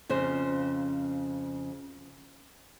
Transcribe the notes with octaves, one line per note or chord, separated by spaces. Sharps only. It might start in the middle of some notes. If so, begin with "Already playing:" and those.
F2 C#3 C5